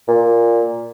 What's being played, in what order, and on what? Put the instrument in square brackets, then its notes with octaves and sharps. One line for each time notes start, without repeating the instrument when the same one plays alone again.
[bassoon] A#2